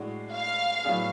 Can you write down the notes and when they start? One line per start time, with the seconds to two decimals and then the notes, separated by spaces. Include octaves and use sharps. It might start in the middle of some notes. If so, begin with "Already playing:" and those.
Already playing: A2 G#3 D4 F#4
0.32 F5
0.84 A2 F#3 B3 D4 G#4